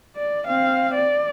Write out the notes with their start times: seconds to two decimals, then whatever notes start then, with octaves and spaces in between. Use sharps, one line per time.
0.16 D5
0.47 C4 F5
0.95 D5